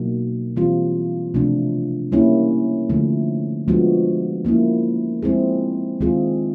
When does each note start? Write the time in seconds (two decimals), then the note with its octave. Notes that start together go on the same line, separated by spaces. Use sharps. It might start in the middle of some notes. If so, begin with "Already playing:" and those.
Already playing: B2 F#3 A#3 D#4 F#4
0.56 E3 G3 C4 F4
1.34 C3 F3 A3 D4
2.12 G3 A#3 C#4 E4
2.90 D3 F3 A3
3.68 F3 G#3 B3 D4 F#4
4.45 F3 A#3 C#4 E4
5.22 F3 G#3 C4 E4 G#4
6.01 D#3 G#3 C4 F4 G#4